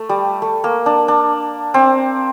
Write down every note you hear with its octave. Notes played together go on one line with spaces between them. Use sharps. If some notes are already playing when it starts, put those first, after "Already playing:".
Already playing: A3
G3
A3
A#3
D4
D4
C4